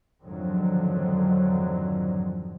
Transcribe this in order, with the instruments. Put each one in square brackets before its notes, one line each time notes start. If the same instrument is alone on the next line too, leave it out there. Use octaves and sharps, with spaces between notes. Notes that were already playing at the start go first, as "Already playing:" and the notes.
[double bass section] F2 G#2 D3 D#3 F3 F#3